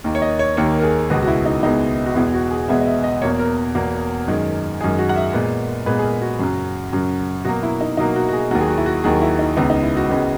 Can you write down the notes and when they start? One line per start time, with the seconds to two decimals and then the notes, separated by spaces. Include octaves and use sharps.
0.04 D#2 D#3 A#3
0.15 C#5
0.22 D#5
0.39 C#5
0.57 D#2 D#3 A#3 C#5
0.79 A#4
0.83 G#4
1.10 C#2 B2 G#3 B3 F#4
1.23 F#4
1.28 E4
1.46 D#4
1.63 C#2 B2 G#3 B3 D#4
2.06 F#4
2.15 E2 B2 G#3 B3 E4
2.34 F#4
2.51 G#4
2.68 E2 B2 G#3 B3 E5
2.81 D#5
2.87 E5
3.04 D#5
3.22 E2 B2 A#3 C#5
3.39 A#4
3.75 E2 B2 A#3
4.28 F#2 D#3 G#3
4.81 F#2 D#3 G#3 G#4
4.99 F#4
5.09 F#5
5.16 E5
5.33 A#2 G#3 B3
5.86 A#2 G#3 B3 B4
5.99 G#4
6.04 A#4
6.22 F#4
6.39 F#2 C#3 F#3
6.93 F#2 C#3 F#3
7.45 B2 F#3 A#3 F#4
7.63 E4
7.81 D#4
7.97 B2 F#3 A#3 D#4
8.16 F#4
8.29 F#4
8.33 G#4
8.51 D#2 D#3 F#3 F#4
8.61 G#4
8.68 F#4
8.78 E4
8.86 F#4
9.04 D#2 D#3 F#3 G#4
9.22 E4
9.39 D#4
9.57 C#2 C#3 G#3 B3 D#4
9.70 D#4
9.83 E4
9.97 F#4
10.10 C#2 C#3 G#3 B3